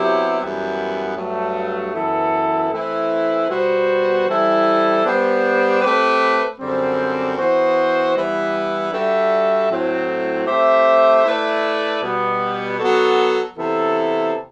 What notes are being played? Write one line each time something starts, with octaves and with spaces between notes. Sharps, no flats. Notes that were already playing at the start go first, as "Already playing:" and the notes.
Already playing: C3 F#3 B3 E4 G4
F#2 E3 G3 B3
G2 F#3 A3
F#2 E3 B3 E4 A4
E3 A3 C4 E4 B4
B2 G3 B3 F#4 C5
E3 G3 C4 E4 A4
G3 B3 D4 G4 C5
A3 C4 G4 B4
F#2 D3 G3 C4
E3 B3 F#4 C5
E3 G3 B3 E4 B4
G3 D4 F#4 A4 E5
A2 F#3 C4
A3 C4 G4 C5 E5
A3 E4 B4 D5
B2 G3 B3
F#3 B3 F#4 A4
C3 E3 B3 E4 A4